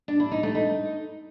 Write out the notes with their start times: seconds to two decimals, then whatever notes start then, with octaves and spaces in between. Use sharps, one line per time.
0.08 D4
0.20 E4
0.31 D#4
0.43 A3
0.55 D#4